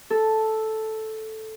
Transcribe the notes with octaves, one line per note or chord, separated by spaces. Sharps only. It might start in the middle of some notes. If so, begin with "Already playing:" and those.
A4